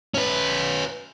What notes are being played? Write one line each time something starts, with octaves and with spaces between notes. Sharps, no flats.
C#4 B4